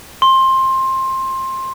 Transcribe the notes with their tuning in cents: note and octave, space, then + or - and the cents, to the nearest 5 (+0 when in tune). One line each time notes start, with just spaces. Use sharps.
C6 +15